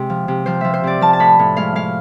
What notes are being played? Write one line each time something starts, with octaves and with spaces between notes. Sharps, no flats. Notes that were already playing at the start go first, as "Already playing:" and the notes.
Already playing: C3 G#3 C5
F3
C3
F3 C5
F3 E5
C5
C3 D5
F3 A5
A5
A2 B5
A2
G#3 F5
G#3 F5